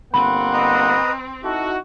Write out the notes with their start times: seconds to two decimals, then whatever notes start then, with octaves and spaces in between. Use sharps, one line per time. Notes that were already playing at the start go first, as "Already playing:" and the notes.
0.14 G1 A#3 C4 F#5 B5
0.54 B4 D#5 A#5
1.44 D#4 E4 F#4 A4